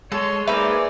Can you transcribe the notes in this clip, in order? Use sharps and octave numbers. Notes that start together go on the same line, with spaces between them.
G#3 A4 C#5 C6
A#3 D#4 G#4 B4 C5 D5 E5 F5